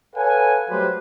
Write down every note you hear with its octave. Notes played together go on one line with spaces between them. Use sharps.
A4 B4 C#5 F5 F#5 G#5
F#3 G3 A3 G4 B4 C5